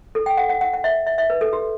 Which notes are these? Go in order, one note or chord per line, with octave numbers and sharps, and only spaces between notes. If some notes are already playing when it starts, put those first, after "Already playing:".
A4
G5
F#5
F#5
F#5
F#5
E5
E5
E5
B4
A4
G4